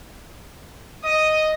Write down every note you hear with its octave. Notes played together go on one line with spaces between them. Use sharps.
D#5 D#6